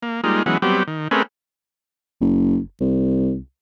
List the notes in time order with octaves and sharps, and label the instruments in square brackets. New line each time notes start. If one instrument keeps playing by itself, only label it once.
[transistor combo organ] A#3
G3 G#3 A#3 D#4 F4
E3 F#3 G#3 B3 C#4
F#3 G3 B3 C4 G4
D#3
A3 C4 C#4 G#4 A#4 B4
[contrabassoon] F#1
C2